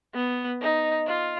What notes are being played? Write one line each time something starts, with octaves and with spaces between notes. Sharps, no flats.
B3
D#4
F4